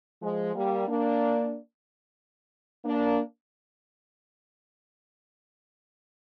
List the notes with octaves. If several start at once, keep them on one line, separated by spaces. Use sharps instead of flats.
F3 G#3
G3 A#3
A#3 D4
A#3 D4